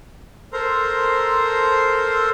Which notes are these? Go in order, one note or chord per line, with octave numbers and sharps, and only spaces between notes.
A4 A#4 C5 A#5 C6